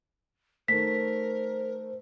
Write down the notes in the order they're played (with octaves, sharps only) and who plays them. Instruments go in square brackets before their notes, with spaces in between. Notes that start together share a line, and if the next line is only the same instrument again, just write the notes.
[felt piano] D#3 A3 [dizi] A#4 [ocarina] C5 [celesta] B6